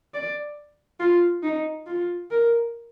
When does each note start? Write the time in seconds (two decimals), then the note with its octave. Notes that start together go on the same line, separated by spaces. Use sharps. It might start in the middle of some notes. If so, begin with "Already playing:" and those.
0.14 D5
1.00 F4
1.43 D#4
1.87 F4
2.31 A#4